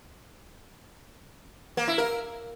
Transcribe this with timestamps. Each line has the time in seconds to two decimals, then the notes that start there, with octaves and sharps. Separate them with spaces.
1.77 A#3
1.88 E4
1.98 A#4